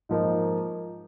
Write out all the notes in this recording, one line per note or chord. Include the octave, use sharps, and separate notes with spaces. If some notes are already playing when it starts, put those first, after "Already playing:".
G#2 F3 A#3 D#4